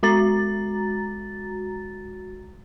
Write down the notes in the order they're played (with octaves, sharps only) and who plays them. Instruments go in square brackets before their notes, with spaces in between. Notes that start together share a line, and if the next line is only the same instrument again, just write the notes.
[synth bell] G#3 F#4 A#5 A6